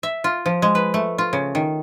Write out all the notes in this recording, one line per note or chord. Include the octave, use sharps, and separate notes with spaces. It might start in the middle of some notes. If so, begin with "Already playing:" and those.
E5
F4
F3
G#3
B4
A3
F4
C#3
D#3